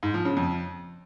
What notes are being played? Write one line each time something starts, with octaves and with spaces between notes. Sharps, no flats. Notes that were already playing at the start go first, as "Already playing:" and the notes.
G#2
F3
C#3
F2